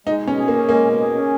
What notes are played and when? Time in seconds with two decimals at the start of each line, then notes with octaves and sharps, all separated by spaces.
0.07 G#3 D#4
0.22 B2
0.27 C#4
0.37 G#4
0.48 A#3
0.54 C#4
0.69 G#3 A#3
0.84 B2
1.00 G#4
1.16 C#4